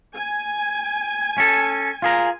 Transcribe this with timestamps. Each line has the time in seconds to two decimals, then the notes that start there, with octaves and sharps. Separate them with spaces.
0.14 G#5
1.38 C#4 A4
2.02 F4 G#4 A#4